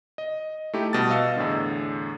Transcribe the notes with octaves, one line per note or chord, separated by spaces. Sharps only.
D#5
A3 D#4 E4 G4
B2 G3 A5 A6
D#5 F5 E6 C#7
E2 A2 D3